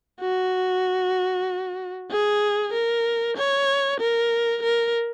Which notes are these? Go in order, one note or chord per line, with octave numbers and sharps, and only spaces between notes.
F#4
G#4
A#4
C#5
A#4
A#4